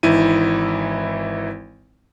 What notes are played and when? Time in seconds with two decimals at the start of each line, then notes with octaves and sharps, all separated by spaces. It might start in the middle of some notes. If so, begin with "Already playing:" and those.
0.03 G#1 E3 D#4 E4 D#7